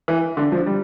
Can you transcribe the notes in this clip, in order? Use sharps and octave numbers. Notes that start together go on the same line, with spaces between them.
E3
D3
F3
G3